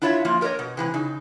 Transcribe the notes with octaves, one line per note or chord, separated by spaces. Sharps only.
D4 E4 F4 C#5 E5
F3 A#3 F4
G4 A#4 C5 C#5 D#5
B2
C3 E3 F3 G#3
C#3 D#4